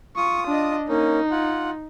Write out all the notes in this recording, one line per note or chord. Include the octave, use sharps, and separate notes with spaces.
F4 C#6 D#6
D4 D#5
A#3 C#4 D#4
F4 F#5